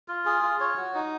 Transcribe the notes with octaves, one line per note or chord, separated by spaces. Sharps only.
F4
G#4
F4
C#5
F#4
D#4